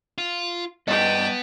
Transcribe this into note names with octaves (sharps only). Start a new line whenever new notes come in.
F4
G2 B3 D#5 G5 A5